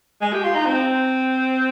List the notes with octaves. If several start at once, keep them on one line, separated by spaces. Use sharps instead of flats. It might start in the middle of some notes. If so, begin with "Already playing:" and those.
G#3
G4
F4
D#4
C4